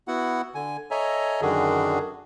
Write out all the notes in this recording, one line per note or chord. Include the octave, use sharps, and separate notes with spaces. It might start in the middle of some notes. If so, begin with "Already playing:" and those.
B3 E4 F#4 F#5
D3 G#5
A4 C#5 D#5 E5 G#5 A#5
F#2 D3 D#3 D4 F#4 G#4